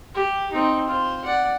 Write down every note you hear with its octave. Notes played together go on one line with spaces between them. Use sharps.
G4
C4 D#4
F4 C5
D5 F#5